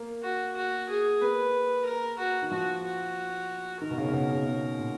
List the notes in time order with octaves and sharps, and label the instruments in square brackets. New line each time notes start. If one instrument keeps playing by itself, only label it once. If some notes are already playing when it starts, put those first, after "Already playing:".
Already playing: [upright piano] A#3
[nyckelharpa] F#4
F#4
G#4
[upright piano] A#3 [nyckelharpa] B4
[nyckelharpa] A#4
F#4
[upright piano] D#3
[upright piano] F3 [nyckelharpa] F#4
[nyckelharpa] F#4
[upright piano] D#3 [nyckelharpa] A#4
[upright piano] B2
C#3
C#3
B2
C#3
C#3
A#2